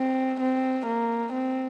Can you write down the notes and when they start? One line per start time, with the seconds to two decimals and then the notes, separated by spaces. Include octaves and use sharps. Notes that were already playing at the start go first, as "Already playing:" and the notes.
Already playing: C4
0.40 C4
0.86 A#3
1.32 C4